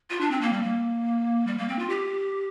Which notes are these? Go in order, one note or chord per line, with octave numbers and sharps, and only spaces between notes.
F4
D4
C4
A#3
G3
A#3
G3
A#3
C4
F4
G4